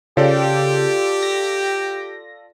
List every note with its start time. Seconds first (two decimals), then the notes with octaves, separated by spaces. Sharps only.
0.17 C#3 F4 G4 A4 D5
1.23 A#6